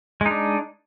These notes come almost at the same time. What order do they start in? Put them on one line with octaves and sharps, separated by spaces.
G#3 D#4 D4